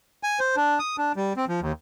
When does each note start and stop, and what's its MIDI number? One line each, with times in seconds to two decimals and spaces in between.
0.23 0.39 80
0.40 0.56 72
0.56 0.79 62
0.79 0.96 87
0.98 1.12 62
1.16 1.33 55
1.37 1.45 60
1.48 1.60 53
1.61 1.72 39